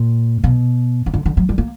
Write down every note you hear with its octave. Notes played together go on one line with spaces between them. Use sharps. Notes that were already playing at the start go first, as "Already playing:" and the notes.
Already playing: A#2
B2
C#3
D3
D3
F#3
G3
A#3